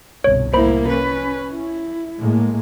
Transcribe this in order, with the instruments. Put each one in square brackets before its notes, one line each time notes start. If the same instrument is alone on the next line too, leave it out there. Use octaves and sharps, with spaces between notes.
[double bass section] G1 C2 B2 [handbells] C#5
[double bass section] C2 A2 [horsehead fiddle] A#3 E4 [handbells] C5 B5
[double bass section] C#4 [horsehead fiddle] B4
[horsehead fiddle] E4
[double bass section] A2 G#3 A#3